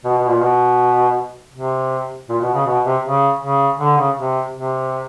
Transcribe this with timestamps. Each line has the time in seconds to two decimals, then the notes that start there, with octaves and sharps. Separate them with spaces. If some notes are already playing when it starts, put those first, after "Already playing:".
0.05 B2
0.18 B2
0.29 A#2
0.41 B2
1.54 C3
2.29 A#2
2.41 B2
2.54 C#3
2.66 B2
2.85 C3
3.04 C#3
3.42 C#3
3.79 D3
3.97 C#3
4.16 C3
4.54 C3